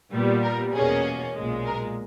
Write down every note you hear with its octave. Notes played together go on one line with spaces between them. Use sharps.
A#2 G3 B3
A#4
E2 B2 A#3 C#4 G#4
B1 A#2 G#3
A#4